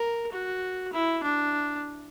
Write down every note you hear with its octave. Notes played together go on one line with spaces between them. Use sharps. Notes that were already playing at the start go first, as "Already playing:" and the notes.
Already playing: A#4
F#4
E4
D4